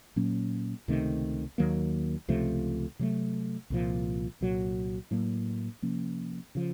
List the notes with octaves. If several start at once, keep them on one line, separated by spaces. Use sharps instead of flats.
A#2 F#3 A#3 C#4
C#2 C3 D#3 A3
D#2 D#3 F#3 A#3
C#2 C3 F3 A3
C3 F#3 A3
C2 A#2 F3
C2 A#2 F#3
A2 F#3 A#3
C3 F3 A#3 C#4
C#3 F3